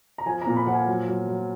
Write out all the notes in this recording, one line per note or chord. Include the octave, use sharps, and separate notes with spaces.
A#5
F3 G#5
A#5
A#2
B5
F3 F#5
G#5
F#3
F#3
F#3